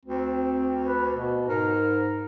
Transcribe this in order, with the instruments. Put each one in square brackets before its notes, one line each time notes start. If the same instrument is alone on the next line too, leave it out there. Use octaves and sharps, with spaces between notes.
[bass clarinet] D2 [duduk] C4
[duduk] B4
B2
[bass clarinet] G#2 [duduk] A#4